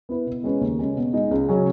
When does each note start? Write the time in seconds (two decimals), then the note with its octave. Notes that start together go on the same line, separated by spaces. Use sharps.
0.09 B3 E4 B4
0.26 B2
0.44 G#3 C#4 G#4 B4
0.61 D#2
0.79 C#3 G#3 C#4
0.96 B2
1.13 G#3 D#4
1.31 C#2
1.49 C#3 F#3 C#4